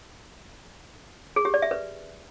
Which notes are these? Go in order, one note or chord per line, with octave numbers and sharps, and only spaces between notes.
G#4
G4
D5
E5
B4